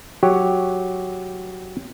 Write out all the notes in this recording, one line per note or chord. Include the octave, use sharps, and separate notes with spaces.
F#3 G4 C#5